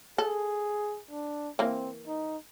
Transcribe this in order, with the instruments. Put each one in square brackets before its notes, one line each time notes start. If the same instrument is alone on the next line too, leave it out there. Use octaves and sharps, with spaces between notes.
[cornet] G#4 [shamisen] A4
[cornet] D4
[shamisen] E3 A#3 [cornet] C4
[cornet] D#4